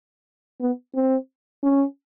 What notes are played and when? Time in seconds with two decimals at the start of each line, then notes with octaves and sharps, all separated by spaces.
0.60 B3
0.95 C4
1.63 C#4